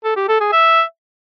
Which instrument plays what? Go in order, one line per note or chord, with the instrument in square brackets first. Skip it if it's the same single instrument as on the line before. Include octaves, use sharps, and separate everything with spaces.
[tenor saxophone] A4
G4
A4
G#4
E5